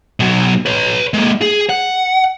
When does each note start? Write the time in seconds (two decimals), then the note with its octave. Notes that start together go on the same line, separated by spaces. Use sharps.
0.20 B2 F#3
0.66 B4 C#5
1.14 G#3 A#3
1.42 G#4
1.70 F#5